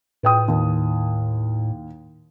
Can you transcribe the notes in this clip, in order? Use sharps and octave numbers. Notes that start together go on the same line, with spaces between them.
A2 B4 G5 D#6
D#2